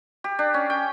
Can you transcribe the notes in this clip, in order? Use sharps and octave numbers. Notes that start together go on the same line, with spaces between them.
G4
D4
C#4
G5